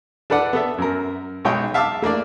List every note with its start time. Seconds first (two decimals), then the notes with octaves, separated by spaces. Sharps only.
0.30 D4 A4 B4 D5 F#5
0.53 B3 A4 E5
0.78 F#2 A#4
1.45 B1 G#3 C#5 D#5 G5 D#6
1.74 E5 F5 A5 D6 E6
2.02 A3 A#3 D4 D5